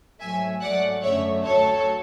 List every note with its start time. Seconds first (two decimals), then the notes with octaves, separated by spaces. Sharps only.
0.19 G#2 F#3 A3 E5 G#5
0.61 G#2 F#3 A3 D5 F#5
1.03 F#2 D3 A3 C#5 E5
1.44 D2 D3 F#3 A4 C#5